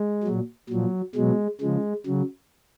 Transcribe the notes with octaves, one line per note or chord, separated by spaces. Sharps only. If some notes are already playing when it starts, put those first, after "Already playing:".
Already playing: G#3
A#2 F#3
A#2 F3 F#3
B2 F#3 G#3
C#3 F3 G#3
C#3 F#3